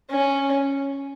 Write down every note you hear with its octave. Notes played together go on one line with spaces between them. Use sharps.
C#4